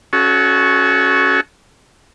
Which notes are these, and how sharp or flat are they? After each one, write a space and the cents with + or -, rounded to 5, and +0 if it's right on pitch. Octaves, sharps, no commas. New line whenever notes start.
C#4 +0 F#4 +0 A4 -35